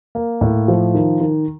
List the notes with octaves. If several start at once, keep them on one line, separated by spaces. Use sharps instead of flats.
A#3
A2
F3
D#3
D#3